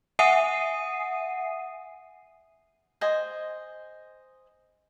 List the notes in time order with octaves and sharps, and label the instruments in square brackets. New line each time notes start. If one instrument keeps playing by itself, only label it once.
[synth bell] E5 F#5 G#5 D#6 C7 D#7
[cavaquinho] C5 D#5 G#5